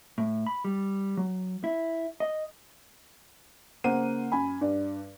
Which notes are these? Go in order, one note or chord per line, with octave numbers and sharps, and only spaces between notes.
A2
B5
G3
F#3
E4
D#5
C#3 A#3 C5 F#5 D#7
F#2 G#5 B5
G2 D5